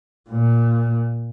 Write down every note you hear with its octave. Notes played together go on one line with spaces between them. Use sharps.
A#2